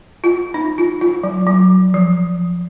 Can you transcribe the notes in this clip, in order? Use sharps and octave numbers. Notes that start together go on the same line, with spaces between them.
F4
D#4
F4
F4
F#3
F#3
F3